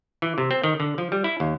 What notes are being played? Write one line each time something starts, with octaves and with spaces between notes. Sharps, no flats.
E3
C3
C4
D#3
D3
F3
G3
E4
D#2